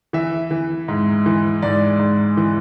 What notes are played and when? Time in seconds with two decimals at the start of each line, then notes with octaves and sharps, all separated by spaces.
0.13 E3 E5
0.51 E3
0.88 G#2
1.26 E3
1.62 G#2 D5
1.99 G#2
2.37 E3